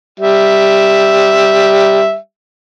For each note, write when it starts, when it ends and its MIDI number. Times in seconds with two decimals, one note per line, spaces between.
0.20 2.16 55
0.20 2.16 76